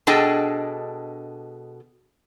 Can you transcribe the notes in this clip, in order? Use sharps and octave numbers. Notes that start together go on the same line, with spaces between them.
B2 D4 G#4 A4 D#5 G5